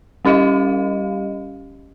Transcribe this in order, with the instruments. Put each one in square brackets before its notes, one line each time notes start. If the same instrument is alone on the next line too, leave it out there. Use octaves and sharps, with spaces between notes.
[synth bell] G3 C#4 G4 D#5 F5